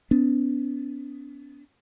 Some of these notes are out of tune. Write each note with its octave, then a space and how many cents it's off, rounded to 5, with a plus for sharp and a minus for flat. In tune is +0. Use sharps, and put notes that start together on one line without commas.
B3 +25 D4 -45